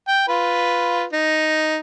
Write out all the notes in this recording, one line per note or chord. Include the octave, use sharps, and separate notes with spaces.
G5
F4 B4
D#4